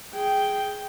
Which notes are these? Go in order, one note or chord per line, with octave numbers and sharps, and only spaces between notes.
G#4 G5